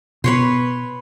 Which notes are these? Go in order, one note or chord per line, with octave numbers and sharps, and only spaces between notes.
B2 B3 B4 C#5 C6